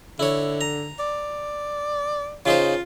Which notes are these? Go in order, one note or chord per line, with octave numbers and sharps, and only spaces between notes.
D3 E4 C#5
A#5
D5
C#3 D#4 F4 C5